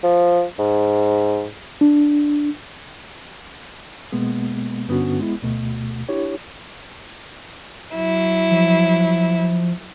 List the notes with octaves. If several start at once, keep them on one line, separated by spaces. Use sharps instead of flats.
F3
G#2
D4
B2 G#3 A#3 B3
G2 D3 B3 C#4 D4 F#4
G#3 B3 E4
D2 B2 A3
D4 E4 G4 C#5
F#3 E4
F3